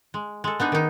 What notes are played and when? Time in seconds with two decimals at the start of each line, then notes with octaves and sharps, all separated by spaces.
0.14 G#3
0.44 G#3 A4
0.60 B3 D4 D#4 G#4
0.72 D#3 D#4